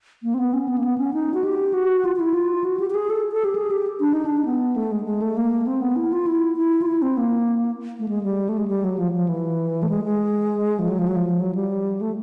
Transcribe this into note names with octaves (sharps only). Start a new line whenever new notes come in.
A#3
C4
B3
C#4
B3
A#3
B3
C#4
D#4
F#4
G4
F#4
F4
F4
E4
F4
F#4
G4
G4
G#4
A4
A4
G4
G#4
G4
D4
D#4
D4
B3
A3
G#3
G#3
A3
A#3
C4
B3
E4
F4
E4
E4
F4
E4
C4
A#3
A3
G#3
G3
A3
G#3
G3
F#3
F3
F3
E3
A3
G#3
G#3
F3
F#3
F3
F#3
F3
F#3
G3
A3